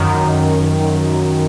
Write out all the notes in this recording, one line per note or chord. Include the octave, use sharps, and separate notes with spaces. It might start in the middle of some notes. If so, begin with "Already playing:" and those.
Already playing: F#2 D#3